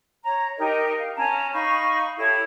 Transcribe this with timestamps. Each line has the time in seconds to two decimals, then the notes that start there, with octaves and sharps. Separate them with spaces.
0.24 C#5 A#5
0.57 D#4 G4 A#4 D#5
0.98 F5
1.15 C#4 A5 A#5
1.53 D#4 F5 B5 C#6
2.18 E4 G4 A4 C#5